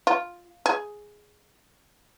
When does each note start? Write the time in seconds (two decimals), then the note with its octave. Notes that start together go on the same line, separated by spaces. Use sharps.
0.07 F4
0.66 G#4